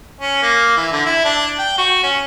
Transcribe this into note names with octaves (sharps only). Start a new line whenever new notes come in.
C#4
A#3
E3
D3
E4
D4
G5
F#4
C#4